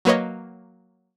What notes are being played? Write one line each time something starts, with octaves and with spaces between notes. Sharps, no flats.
F#3 A#3 B4 C#5 D#5